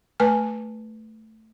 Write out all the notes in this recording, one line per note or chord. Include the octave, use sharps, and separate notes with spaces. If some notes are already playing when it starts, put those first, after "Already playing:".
A3 B4 G#5 F6